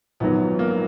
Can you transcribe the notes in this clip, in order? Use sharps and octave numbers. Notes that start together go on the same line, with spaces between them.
A#1 G#2 D#3 F#3 B3
A#3